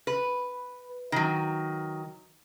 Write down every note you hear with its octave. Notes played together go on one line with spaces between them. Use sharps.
B4
D#3 F#3